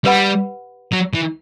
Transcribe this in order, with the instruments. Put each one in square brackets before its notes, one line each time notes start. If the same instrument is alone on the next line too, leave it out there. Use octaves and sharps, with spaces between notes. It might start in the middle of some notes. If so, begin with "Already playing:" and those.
[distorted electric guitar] G3 [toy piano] G4 B4 F#5 B5
[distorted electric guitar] F#3
E3